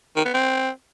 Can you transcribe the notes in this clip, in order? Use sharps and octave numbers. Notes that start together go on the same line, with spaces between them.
D#3
B3
C4